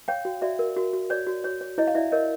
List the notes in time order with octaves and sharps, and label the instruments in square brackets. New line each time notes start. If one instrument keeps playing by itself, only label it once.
[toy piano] C#5 F5 G5
F#4
F#4 D5 E5
A#4
F#4
F#4
C#5 D5
F#4
C#5
C#5
E4 C#5 D#5
F5
E4 D5 E5
A#4 C#5 D#5